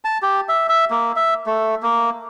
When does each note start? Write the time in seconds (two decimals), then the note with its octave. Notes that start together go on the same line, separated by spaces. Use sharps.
0.05 A5
0.22 G4
0.49 E5
0.69 E5
0.91 A#3
1.16 E5
1.46 A3
1.83 A#3